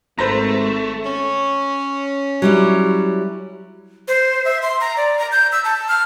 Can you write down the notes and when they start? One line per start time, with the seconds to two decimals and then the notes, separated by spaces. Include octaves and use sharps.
0.19 G#1 A3 B4 C5 A#5
1.06 C#4
2.42 F#3 G3 E4
4.08 C5
4.45 E5
4.62 C6
4.81 A#5
4.97 D5
5.19 A#5
5.32 G6
5.52 E6
5.65 A5
5.88 F6